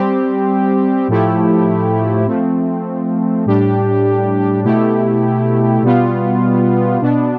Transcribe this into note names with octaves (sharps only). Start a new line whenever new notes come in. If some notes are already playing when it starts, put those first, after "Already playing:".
Already playing: G3 C4 G4
A2 F3 A3 E4 G4
F3 A3 C4
A2 G3 D4 G4
B2 A3 E4 G4
B2 G3 B3 F4
B2 B3 D4